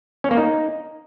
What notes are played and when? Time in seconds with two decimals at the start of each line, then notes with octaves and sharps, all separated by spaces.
0.24 C#4
0.31 A#3
0.37 D#4